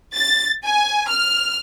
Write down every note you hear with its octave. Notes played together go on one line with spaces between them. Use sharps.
A6
G#5
F6